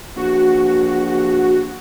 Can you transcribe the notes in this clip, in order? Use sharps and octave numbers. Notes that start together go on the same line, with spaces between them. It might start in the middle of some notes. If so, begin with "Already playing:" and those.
A#1 F#4